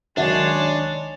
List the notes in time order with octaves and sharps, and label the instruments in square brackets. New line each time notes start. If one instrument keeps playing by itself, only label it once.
[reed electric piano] C2 D#3 A6 [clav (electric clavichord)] F#2 [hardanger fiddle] G#3 C#5 [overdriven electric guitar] D4